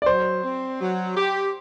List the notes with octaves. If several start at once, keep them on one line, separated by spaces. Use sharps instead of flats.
D5
F#3 C5
C4
F#3
G4